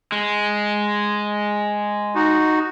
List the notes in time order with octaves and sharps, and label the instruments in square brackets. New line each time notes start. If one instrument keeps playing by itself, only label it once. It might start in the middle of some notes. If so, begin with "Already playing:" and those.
[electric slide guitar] G#3
[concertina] D#4 F#4